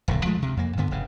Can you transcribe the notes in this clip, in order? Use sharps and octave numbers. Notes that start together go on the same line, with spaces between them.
D#1 B1 A2 D3
F3 G#3 A3
D2 C3
F2 A#3
D2 G2 D3 B3
F1 G2 C#3